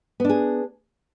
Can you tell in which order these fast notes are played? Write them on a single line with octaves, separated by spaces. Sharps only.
B3 D4 G#4